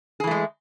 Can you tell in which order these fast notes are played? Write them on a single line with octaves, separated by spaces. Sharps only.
G#4 E3 A3 G#3